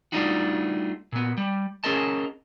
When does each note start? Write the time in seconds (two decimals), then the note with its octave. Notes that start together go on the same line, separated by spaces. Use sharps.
0.12 G3 A3 D4 D#4 F4 F#4
1.12 A#2 B3
1.38 G3
1.84 C#4 G#4 A#4 D#5 A5